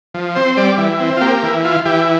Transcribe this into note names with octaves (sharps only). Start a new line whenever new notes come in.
F3
C4 C5
G3 D5
E3
C4
F4
A#3 G4
E3
F4
E3 G4